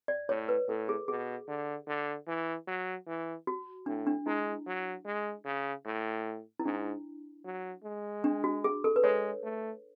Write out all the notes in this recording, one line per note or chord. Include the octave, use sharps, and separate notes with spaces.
D5
A2 C#5
B4
A2 A4
G#4
B2 G#4
D3
D3
E3
F#3
E3
F#4
A2 D4
D4
G#3 E4
F#3
G#3
C#3
A2
E4
G#2 D4
F#3
G#3
D4
F#4
G#4
A4
B4
G#3 C#5
A3